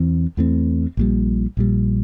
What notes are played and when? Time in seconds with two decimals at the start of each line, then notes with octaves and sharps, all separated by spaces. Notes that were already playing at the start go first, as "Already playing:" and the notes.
Already playing: E2 E3 C4
0.37 E2 E3 A3 C4
0.97 A#1 A#2 G3
1.57 A#1 A#2 G3